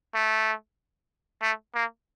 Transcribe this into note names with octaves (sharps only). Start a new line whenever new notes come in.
A3
A3
A#3